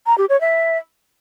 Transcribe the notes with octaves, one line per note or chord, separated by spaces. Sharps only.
A#5
G4
C#5
E5